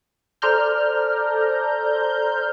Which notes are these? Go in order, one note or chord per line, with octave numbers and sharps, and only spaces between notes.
A4 C5 D5 A#5 F6 G6